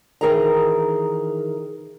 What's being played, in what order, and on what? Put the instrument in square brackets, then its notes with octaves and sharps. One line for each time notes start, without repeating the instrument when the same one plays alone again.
[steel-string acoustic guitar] D#3 E3 G#4 A#4 D#5 A#5